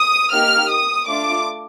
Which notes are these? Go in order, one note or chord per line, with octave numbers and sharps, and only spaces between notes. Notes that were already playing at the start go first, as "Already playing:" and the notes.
Already playing: D#6
A#3 D#4 G4 F6
D#6
A3 D4 F4 D6